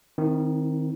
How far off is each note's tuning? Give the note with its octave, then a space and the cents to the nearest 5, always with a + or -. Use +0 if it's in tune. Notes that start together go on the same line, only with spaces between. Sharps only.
D#3 +0 C4 +0 E4 -35